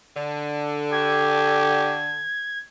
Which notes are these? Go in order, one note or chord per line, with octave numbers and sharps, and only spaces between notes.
D3
G4 G#6